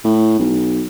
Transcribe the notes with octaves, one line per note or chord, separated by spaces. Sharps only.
A2
B1